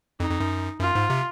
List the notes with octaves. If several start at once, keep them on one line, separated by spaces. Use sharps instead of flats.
F2 D#4
F2
F#2
F#2 F4
G#2
C3